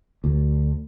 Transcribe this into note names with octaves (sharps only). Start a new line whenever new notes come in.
D2